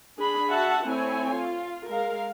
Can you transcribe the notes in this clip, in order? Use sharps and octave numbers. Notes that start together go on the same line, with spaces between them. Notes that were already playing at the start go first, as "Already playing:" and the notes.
D4 G#4 B5
F#4 E5 F#5 A5
A3 C4 E4 C#5 G#5
F4
G#3 A#4 F5